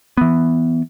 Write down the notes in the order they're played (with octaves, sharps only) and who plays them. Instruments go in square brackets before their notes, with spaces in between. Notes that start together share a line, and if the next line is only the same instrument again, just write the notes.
[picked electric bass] E3 B3